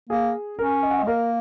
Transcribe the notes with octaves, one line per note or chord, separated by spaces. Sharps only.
A#3 G#4
C#4 A#4
D#5
F#5
D#5
G#3
A#3 A#4